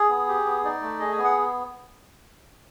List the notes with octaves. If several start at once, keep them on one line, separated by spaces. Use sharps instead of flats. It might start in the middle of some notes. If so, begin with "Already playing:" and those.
Already playing: G#4
B3
G4
B3
D#4 D5
A3
G#4 D#5
G#5
B3
F#5